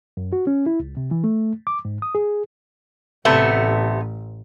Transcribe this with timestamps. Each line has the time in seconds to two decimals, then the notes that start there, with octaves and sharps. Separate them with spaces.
0.17 F#2
0.33 F#4
0.47 C#4
0.66 E4
0.80 C#2
0.97 C3
1.11 E3
1.24 A3
1.67 D6
1.85 G#2
2.02 D#6
2.15 G#4
3.25 A1 C3 A3 B3